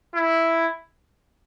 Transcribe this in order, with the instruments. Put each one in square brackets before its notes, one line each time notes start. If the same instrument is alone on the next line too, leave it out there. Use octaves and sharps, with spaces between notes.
[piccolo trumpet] E4